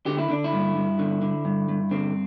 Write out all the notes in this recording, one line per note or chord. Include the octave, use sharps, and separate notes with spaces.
D3 G4
E4
D3 D4
E4
G2
G2
D3
D3
G2
G2
D3 C4